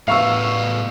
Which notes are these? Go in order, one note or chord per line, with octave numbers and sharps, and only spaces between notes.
A2 B3 F5 C#6 E6